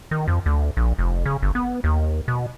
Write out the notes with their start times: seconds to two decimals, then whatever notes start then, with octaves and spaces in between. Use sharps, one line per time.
0.11 D#3
0.28 F2
0.46 D2
0.77 A#1
0.99 F1
1.26 C#3
1.42 G1
1.55 B3
1.84 D#2
2.28 B2